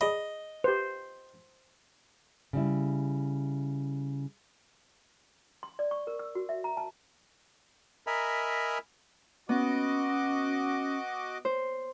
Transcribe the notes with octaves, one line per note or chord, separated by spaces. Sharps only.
G#4 D5 D#5 B5
G4 B4 C5
C#3 G3 E4
C6
D5
C#6
A#4
E6
F#4
E5
A#5
A5
A#4 D#5 E5 G#5 A#5 B5
B3 C#4 F#4 D#5 D6
C5